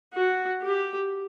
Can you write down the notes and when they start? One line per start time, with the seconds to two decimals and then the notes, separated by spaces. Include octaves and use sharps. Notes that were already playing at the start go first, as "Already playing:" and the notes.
0.14 F#4
0.62 G4